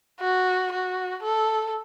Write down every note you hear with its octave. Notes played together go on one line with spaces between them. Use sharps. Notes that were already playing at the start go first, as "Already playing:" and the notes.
F#4
F#4
A4